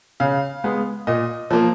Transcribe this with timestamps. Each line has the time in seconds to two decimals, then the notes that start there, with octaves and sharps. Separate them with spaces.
0.20 C#3 F5
0.64 G#3 B3
1.07 A#2 D#5
1.51 F3 A#3